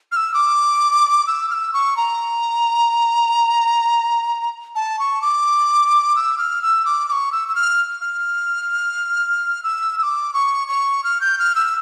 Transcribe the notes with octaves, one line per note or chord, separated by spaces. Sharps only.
F6
E6
D6
E6
F6
E6
C#6
A#5
A5
C#6
D6
E6
F6
E6
D6
D6
C#6
E6
E6
F6
F6
E6
E6
D6
C#6
C#6
F6
G6
F6
E6